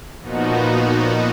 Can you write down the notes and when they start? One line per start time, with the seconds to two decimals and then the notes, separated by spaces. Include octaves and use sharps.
0.20 A#2 F3 B3 D#4 F#4